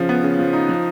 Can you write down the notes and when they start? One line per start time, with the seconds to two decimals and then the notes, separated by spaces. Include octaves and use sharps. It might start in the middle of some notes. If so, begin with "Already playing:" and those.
Already playing: C#3 F3
0.09 B3
0.23 C#3
0.39 F3
0.53 D#4
0.69 F3